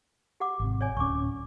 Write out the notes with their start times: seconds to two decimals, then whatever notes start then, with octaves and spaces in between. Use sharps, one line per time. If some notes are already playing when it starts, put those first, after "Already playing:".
0.40 G4 F#5 D6
0.60 G#1 C3
0.81 C#5 D5 G#5
0.97 D1 C#4 C#6 D6